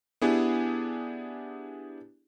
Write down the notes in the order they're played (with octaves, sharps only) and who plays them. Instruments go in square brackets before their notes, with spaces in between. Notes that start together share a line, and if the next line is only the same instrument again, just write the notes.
[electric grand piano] B3 D4 E4 G4 G#4